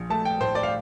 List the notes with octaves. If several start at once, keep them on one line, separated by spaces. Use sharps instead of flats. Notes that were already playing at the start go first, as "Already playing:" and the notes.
Already playing: A#1 F3
A3 A5
G5
A2 C5
D5
F5